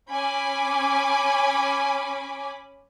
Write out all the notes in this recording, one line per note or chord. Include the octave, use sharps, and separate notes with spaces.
C#4 G#5 B5 D6